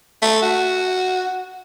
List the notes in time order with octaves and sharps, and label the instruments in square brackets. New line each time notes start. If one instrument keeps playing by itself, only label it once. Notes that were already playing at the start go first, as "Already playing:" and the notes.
[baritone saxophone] A3
F#4